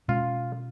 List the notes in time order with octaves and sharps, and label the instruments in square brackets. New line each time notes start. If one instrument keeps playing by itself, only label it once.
[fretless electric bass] B2 G#3 C#4 [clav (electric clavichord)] F4